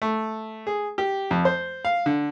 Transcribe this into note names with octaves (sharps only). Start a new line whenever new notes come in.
A3
G#4
G4
F2
C5
F5
D3